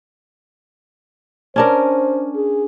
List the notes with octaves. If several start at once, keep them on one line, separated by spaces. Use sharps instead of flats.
C#4 D4 A#4 C5
G#4